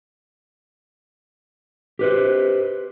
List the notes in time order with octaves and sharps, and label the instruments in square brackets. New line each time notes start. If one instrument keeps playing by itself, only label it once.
[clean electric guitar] G4 B4 C5